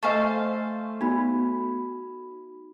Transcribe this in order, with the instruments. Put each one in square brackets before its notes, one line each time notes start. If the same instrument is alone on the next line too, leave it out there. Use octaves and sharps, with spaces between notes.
[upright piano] A3 [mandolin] A4 C5 F5 [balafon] D#5 G#5 C#6
[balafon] B3 [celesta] D#4 F#4 B5